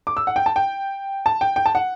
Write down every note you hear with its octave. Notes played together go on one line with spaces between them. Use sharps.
D6
E6
F#5
G5
A5
G5
A5
G5
G5
A5
F#5